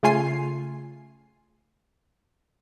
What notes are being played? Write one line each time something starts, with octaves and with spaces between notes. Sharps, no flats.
C#3 A3 F4 G#5 C7